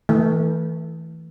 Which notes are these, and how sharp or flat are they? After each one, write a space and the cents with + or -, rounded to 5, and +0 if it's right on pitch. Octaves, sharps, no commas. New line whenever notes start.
E3 -15 A3 +15